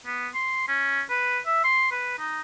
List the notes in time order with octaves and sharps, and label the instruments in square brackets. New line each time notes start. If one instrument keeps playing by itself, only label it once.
[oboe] B3
C6
C#4
B4
E5
C6
B4
D#4